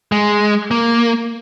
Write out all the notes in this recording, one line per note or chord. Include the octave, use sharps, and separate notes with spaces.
G#3
A#3